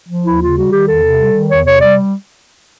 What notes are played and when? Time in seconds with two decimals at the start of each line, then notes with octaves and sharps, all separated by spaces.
0.08 F3
0.24 D#2 E4
0.40 C#3 F4
0.55 G3 F#4
0.71 D#3 G4
0.86 E2 A4
1.01 C3
1.17 G3
1.33 D#3
1.48 E2 C#5
1.64 C3 C#5
1.79 G3 D5